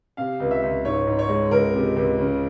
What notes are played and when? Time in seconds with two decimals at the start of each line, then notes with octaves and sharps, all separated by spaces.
0.17 C3 F5
0.40 C#2
0.51 E5
0.63 C#2
0.85 G#2 C#5
1.07 G#2
1.19 C#5
1.29 G#3
1.51 C#2 A#4
1.74 C3
1.96 C#2
2.19 C#3